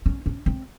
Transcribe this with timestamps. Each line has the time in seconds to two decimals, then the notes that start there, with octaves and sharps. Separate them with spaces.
0.06 C#4
0.26 C#4
0.46 C4